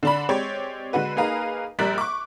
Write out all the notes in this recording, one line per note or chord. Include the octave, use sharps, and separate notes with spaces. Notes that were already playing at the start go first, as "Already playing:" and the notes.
D3 D4 B5
G#3 C4 G4 C#5 D5
D3 G#3 F#4 B4
A#3 D#4 G#4 B4 F5 A#5
A#1 G3 A#4 D5 F#6 B6
C#6 D6